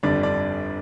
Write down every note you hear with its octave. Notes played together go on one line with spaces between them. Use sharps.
G1 F2 D3 G3 D4 D5
D4 D5